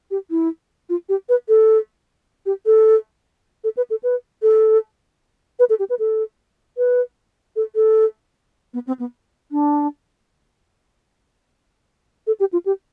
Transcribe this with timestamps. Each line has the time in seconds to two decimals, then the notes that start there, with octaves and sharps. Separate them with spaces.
0.11 G4
0.31 E4
0.89 F4
1.09 G4
1.29 B4
1.49 A4
2.46 G4
2.66 A4
3.64 A4
3.77 B4
3.90 A4
4.03 B4
4.42 A4
5.59 B4
5.70 A4
5.79 G4
5.90 B4
5.99 A4
6.77 B4
7.56 A4
7.75 A4
8.74 B3
8.87 C4
9.00 B3
9.52 D4
12.27 A4
12.40 G4
12.53 F4
12.66 G4